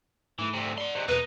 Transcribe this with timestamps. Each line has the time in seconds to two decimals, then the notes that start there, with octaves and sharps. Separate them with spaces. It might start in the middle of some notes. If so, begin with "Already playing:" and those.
0.39 G#2 E3 A3
0.53 D2 C3
0.78 D5 F#5 C6
0.95 G#2 C3
1.08 E2 B2 D#4 B4